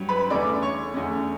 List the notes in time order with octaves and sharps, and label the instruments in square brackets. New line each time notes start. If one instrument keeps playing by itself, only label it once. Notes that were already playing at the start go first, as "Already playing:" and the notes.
Already playing: [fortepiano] G2 F#3 C#4
B4 B5
E2 D3 A3 C#4 D5 D6
C#5 C#6
E2 D3 A3 C#4